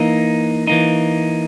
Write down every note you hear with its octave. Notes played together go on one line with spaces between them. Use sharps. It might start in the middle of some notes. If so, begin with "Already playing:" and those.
Already playing: E3 A#3 D#4
E3 A#3 D#4